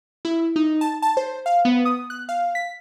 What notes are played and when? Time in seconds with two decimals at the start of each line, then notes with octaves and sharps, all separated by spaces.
0.25 E4
0.56 D#4
0.81 A5
1.02 A5
1.17 C5
1.46 F5
1.65 B3
1.85 D#6
2.10 F#6
2.29 F5
2.55 B6